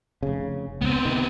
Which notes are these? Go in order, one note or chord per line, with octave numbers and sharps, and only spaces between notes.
F1 C#3
C#2 B3 C4
C3 D#3